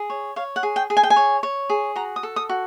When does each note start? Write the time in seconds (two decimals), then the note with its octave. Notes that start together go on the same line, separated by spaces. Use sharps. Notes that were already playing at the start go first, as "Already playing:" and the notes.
Already playing: G#4
0.10 C#5
0.36 C#5 F5
0.56 F#5
0.63 G#4
0.76 G5
0.90 G#4
0.97 G#5
1.03 G5
1.10 G#5
1.16 C#5
1.43 C#5
1.70 G#4
1.96 F#4 A#5
2.16 D#6
2.23 A4
2.36 D#6
2.49 F#4